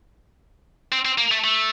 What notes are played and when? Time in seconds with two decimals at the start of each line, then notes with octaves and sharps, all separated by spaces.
0.92 C4
1.05 C4
1.18 A#3
1.31 A3
1.44 A3